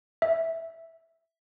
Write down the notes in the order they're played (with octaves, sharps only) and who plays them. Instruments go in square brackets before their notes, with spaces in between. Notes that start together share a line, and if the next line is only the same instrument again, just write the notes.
[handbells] E5